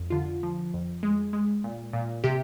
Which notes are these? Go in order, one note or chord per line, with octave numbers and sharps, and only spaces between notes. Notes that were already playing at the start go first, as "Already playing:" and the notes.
Already playing: F2
D3 F4
F3
F2
G#3
G#3
A#2
A#2
C3 G4